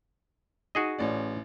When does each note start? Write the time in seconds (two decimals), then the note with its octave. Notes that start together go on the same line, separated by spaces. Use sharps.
0.75 D#4 F#4 G#4 D#5
0.98 A1 C#4 D5